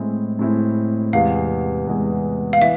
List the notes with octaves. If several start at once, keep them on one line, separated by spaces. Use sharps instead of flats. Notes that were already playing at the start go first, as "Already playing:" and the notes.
Already playing: A2 G#3 C4 E4
A2 G#3 C4 E4
E2 C3 G#3 B3 F5
E2 C3 G#3 B3
F5
E3 B3 E5